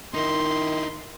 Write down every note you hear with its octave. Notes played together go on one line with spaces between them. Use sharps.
D#3 D#4 E4 C6